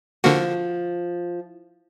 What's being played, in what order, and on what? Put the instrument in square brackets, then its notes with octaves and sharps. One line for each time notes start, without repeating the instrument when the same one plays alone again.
[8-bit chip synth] D3 A#3 F#4 [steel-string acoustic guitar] F3